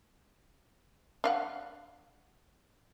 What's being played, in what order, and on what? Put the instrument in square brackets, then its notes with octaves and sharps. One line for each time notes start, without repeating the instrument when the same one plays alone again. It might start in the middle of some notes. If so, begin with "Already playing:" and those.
[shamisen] D4 F5 F#5